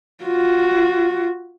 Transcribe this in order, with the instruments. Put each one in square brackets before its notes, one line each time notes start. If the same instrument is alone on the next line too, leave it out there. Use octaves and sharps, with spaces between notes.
[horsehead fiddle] F4 F#4